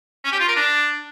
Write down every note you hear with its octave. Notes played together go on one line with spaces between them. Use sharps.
C#4
G4
F4
A#4
D4